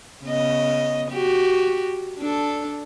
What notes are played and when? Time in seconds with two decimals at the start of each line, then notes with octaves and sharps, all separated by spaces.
0.24 C#3 B3 D#5
1.11 F#4 G4
2.19 D4 A4